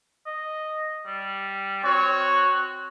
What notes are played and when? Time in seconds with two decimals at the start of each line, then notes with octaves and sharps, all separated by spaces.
0.26 D#5
1.06 G3
1.84 C4 F#4 C#5